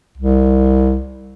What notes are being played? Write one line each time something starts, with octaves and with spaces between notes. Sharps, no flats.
C2